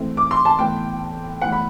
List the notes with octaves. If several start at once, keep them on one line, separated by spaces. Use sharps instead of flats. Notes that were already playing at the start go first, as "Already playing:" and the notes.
Already playing: E3 A3 C4
D6
C6
A5
A2 E3 B3 G5
A2 E3 B3 F#5
B5